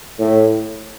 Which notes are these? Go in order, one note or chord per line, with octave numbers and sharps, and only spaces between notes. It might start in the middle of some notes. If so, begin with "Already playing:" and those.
A2